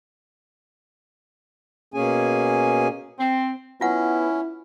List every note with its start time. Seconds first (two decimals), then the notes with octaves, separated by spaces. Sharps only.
1.94 B2 A#3 C#4 G#4 G#5
3.20 C4
3.81 B3 C#4 E4 F4 F#5